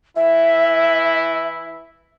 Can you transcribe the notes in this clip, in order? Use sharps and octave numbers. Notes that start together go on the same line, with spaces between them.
E3 E4 E5